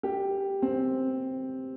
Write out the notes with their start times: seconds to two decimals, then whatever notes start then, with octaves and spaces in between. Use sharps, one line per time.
0.03 G4
0.62 C4